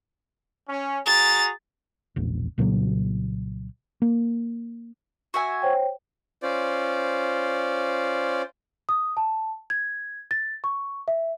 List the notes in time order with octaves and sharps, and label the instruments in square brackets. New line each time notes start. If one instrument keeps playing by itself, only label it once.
[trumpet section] C#4
[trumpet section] F#4 G#4 A#5 [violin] A6
[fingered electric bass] E1 A#1
C2 A#2 C#3 F#3
A#3
[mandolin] F#4 E5 G#5
[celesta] C5 C#5 G5
[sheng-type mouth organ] C#4 F4 C5 D5
[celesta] D#6
A5
G#6
A6
C#6
E5